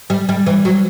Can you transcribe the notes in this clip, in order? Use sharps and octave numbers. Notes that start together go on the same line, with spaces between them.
G3
G3
E3
F#3